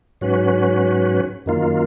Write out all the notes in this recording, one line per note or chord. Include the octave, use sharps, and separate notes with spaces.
G#2 F#3 C#4 F#4 B4
F#2 D#3 A#3 F4